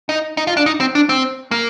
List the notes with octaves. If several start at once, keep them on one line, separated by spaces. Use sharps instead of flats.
D#4
D#4
F4
D4
D#4
C4
D4
C4
A#3